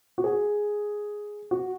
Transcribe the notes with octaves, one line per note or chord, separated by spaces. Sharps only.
F#4
G#4
F#4